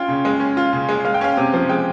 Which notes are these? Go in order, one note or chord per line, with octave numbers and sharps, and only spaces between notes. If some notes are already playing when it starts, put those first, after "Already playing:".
Already playing: C#4 F4 G5
C#3
G#3
C#4
F4
C#3
G#3
G#3 F5
G5
C#4 F5
C3
F3
G#3 G5